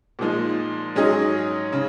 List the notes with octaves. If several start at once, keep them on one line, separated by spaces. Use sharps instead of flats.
A#2 F3 G#3 D#4
G#2 F#3 C#4 G#4 D#5
C#3